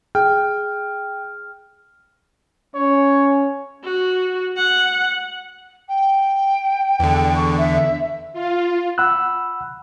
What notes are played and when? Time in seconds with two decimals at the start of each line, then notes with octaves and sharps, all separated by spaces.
0.15 G#4 G5 F6
2.76 C#4 C#5
3.84 F#4
4.57 F#5
5.88 G5
7.00 E2 D3
7.36 C#6
7.57 E5
8.33 F4
8.98 F#5 B5 E6 F#6